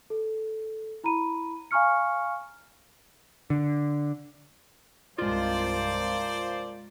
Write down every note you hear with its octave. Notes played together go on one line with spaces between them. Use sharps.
A4
E4 A#5 B5 D#7
F5 G#5 A#5 C#6 F6 C#7
D3
C2 G2 F3 G#3 A#3 F4 C5 D5